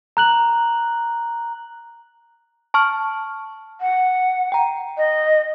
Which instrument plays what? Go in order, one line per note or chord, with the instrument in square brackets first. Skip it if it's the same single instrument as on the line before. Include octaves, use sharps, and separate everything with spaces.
[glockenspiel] A#5 F#6 F#7
[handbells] A5 C#6 F6
[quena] F#5
[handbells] G5 A#5
[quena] D#5